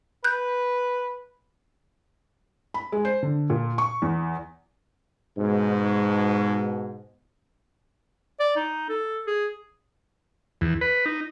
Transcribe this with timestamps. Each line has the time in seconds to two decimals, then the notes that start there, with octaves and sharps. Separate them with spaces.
0.24 B4 F#6 G6
2.74 B5
2.92 G#3
3.05 C5
3.23 D3
3.50 A#2
3.78 C#6
4.02 E2
5.38 G#2 B2
8.40 D5
8.57 D#4
8.89 A4
9.27 G#4
10.61 E2
10.81 B4
11.06 D#4